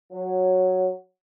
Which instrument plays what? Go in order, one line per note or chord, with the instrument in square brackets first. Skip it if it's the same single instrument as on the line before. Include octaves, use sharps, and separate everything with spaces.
[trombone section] F#3